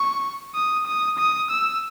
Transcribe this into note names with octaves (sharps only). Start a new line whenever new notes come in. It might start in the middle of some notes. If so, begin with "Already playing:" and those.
Already playing: C#6
D#6
D#6
D#6
E6